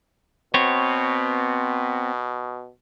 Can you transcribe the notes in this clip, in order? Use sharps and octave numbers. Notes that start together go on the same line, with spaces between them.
B2 B3 C4 C#5